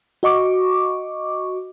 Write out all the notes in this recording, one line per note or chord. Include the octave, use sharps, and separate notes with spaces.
F#4 D#5 C#6 D6